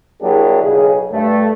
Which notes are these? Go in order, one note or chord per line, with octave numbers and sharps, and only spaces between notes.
F#3 A#3 D4 E4 G4 G#4
B1 C#3 G#4
G2 A3